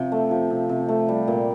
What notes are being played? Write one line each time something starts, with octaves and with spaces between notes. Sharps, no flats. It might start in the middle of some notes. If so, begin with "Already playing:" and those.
Already playing: C3 F3
A3
F3
C3
C3
A3
G3
A#2